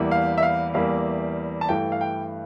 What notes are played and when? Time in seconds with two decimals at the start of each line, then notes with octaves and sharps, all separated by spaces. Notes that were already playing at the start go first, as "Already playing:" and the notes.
Already playing: E2 E3 G3 A#3
0.11 F5
0.38 E5
0.43 F5
0.74 E2 E3 G3 A#3 F5
1.61 A5
1.68 G2 E3 A3 G5
1.92 F5
2.01 G5